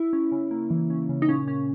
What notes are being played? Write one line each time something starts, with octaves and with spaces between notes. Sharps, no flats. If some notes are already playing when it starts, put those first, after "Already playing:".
Already playing: E4
C#4
C#3
A#3
E3
C#4
C#3
D#4
A#2 C#4
A#2 C#4